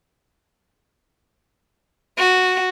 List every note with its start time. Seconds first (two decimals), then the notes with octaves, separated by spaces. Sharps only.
2.18 F#4